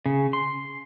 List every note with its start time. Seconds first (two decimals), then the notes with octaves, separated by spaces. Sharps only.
0.06 C#3
0.33 C6